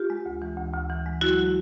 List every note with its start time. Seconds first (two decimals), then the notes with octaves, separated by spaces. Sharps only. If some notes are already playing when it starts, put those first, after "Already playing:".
Already playing: F4 G4
0.10 G#3
0.26 D2
0.42 E3
0.57 D2
0.73 D2
0.89 E3
1.06 G#3
1.21 F#3 E4 F#4
1.37 F#3